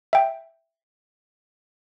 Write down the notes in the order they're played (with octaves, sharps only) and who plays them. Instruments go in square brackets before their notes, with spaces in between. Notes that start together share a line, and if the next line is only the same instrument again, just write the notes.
[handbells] E5 G5